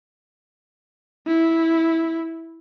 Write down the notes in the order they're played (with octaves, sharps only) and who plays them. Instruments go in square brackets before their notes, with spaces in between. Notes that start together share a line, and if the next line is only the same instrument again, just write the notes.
[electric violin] E4